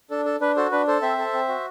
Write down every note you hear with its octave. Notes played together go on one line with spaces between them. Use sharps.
D4 A4
A4
D4 B4
F#4 A4 C5
D4 B4
A4 C5
C4 C5 E5
A4
C4
F#4